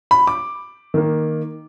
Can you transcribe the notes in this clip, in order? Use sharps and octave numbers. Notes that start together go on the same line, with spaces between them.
B5
D6
D#3 A#3